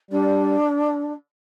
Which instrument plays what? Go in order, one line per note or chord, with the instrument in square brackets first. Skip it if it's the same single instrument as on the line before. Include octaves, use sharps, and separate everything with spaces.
[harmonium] G3 [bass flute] D4